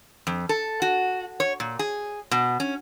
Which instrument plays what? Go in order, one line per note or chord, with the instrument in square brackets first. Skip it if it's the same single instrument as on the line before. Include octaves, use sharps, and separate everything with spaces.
[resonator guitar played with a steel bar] F2
A4
F#4
C#5
A#2
G#4
B2
C#4